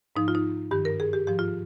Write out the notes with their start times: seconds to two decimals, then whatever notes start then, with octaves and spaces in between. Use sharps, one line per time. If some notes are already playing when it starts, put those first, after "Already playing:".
0.16 G#2 F3 D#4
0.28 F4
0.35 D#4
0.71 G2 D#3 G4
0.85 A#4
1.00 G#4
1.13 G4
1.27 G#2 F3 G4
1.39 F4